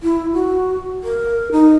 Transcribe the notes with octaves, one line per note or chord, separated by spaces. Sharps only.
E4
F#4
A#4
D#4